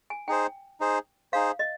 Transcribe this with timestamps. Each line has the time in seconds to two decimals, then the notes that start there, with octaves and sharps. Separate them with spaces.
0.10 G#5
0.28 D#4 G#4 C5 G5
0.80 D#4 G#4 C5
1.33 D#4 G#4 C5 F5
1.59 D#5